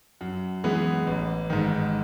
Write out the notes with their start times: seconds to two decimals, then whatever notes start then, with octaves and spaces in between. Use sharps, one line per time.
0.21 F#2
0.64 E3 G#3 B3
1.07 A1
1.50 G#2 D#3